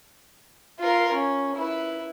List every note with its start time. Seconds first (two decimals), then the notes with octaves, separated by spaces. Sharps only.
0.80 F4 A#4
1.13 C#4
1.56 E4 B4